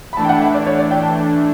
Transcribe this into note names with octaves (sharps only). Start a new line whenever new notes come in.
B5
E3 A3 D4 A5
G5
F#5
E5
D5
C#5
D5
G5
A5